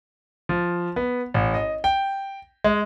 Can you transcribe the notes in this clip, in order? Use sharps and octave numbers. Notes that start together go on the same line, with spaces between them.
F3
B3
A1
D#5
G5
G#3